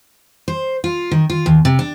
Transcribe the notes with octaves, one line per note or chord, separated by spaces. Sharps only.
C5
F4
D#3
F4
D#2
C3
D4